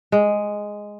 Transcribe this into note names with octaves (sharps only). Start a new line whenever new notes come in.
G#3